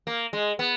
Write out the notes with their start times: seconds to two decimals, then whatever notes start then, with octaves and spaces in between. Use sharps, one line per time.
0.07 A#3
0.33 G#3
0.59 B3